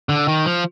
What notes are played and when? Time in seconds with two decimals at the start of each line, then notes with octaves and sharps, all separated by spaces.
0.09 D3
0.28 D#3
0.46 F3